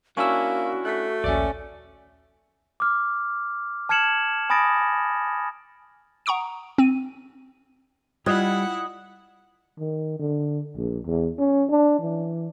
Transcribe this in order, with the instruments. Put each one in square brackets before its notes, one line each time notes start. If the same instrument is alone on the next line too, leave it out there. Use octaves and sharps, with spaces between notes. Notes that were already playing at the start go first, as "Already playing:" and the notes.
[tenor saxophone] A#3 [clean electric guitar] C#4 D4 E4 [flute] F#4 [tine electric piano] C#6 E6
[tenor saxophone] A3 [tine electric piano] F#6 B6
[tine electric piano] A#1 D#2 E5 [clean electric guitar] C#4 D5
[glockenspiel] D6 F6
A5 F6 G#6 C#7 E7 F#7
G#5 B5 D#6 A6 A#6 D7
[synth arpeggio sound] F#5 A#5 C#6 D#6 D7
C4 D#7
[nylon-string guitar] G3 [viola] E4 F#5 [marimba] F4 F#6 G#6 [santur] D#5
[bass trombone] D#3
D3
A#1
E2
C#4
D4
E3